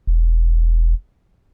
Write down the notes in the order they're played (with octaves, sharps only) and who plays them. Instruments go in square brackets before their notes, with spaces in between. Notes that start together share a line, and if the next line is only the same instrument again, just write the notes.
[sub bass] E1